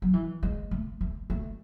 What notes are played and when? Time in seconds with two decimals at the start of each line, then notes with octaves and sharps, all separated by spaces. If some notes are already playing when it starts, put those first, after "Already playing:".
0.02 F#3
0.14 E3
0.43 G#3
0.71 A3
1.01 A3
1.30 A3